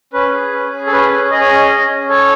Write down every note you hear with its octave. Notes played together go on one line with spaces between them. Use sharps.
C#4 B4
G#4
C#4
G#4
A4
C#4 B4
G#4
G#4 D#5
C#5
C#4 D#5
C#4
C#4
A4 C#5